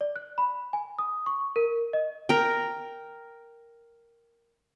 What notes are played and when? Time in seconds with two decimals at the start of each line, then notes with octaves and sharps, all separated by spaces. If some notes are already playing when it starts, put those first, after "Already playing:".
0.01 D5
0.16 F#6
0.38 B5
0.73 G#5
0.98 D#6
1.26 C#6
1.56 A#4
1.93 D#5
2.29 A#4 G5